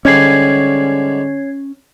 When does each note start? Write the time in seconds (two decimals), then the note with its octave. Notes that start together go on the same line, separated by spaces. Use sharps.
0.05 G#2 D3 G3 C#4 C#5 G#6 C7